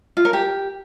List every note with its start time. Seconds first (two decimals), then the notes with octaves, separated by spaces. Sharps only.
0.17 F4
0.25 A#4
0.33 G4